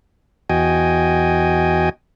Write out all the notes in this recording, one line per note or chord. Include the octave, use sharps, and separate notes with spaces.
E2 F#4 D#5 G5 G#5